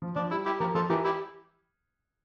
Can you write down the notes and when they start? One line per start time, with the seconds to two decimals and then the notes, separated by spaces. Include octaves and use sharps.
0.02 F3
0.16 F3 D4
0.31 G3 E4
0.46 E4 G4
0.60 F3 G4 A#4
0.75 F3 F4 A4
0.89 E3 G4 A#4
1.04 E4 G4